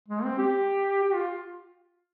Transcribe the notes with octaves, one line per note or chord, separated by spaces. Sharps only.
G#3
C4
G4
G4
F4